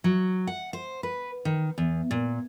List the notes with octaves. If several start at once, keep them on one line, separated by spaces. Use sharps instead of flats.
F#3
F#5
C5
B4
D#3
E2
A#2